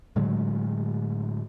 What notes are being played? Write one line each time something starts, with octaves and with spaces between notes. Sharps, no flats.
A2 D3 F#3 G#3